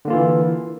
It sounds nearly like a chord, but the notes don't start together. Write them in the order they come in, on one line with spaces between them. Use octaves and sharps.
D3 A#3 F4 E3